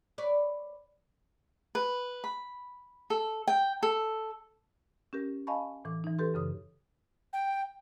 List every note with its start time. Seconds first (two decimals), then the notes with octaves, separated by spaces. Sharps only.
0.18 B4 C#5 D5
1.75 B4
2.24 B5
3.10 A4
3.48 G5
3.83 A4
5.13 C#4 G4 A#4
5.47 D#5 F5 G#5 A5 B5 C#6
5.85 A2 E3 D6
6.04 E3 D#4
6.19 G4 A4 B4 C6
6.34 F#2 C#3 D#6
7.33 G5